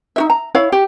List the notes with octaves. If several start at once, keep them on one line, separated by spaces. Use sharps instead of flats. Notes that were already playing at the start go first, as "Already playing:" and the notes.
D#4 F#4 E5
A#5
E4 C#5 F5
G4